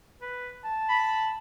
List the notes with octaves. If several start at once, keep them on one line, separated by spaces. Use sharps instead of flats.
B4
A5
B5